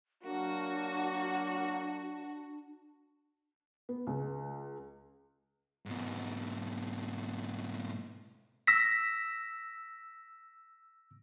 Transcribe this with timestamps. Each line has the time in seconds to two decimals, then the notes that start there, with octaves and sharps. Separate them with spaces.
0.25 F#3 A#3 D4 F#4
3.89 B3
4.07 C#2
5.86 G#2 B2
8.67 E6 A#6 B6